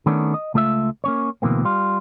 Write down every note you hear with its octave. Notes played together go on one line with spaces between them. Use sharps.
D#3 A3 B3 C#4 D4
D#5
C#2 A3 F4 D#5 E5
A#3 C#4 C#5
D2 B2 E3 A#3 C4
G3 F4